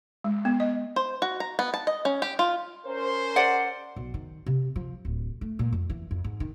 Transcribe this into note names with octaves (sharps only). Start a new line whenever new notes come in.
G#3
B3
D#5
C5
F#4
A#5
B3
A5
D#5
C#4
G4
F4
C#4 A#4 C5
D5 F#5
B1
D#3
C3
F3
D1
A3
A#2
F2
E3
F2
G#2
D#3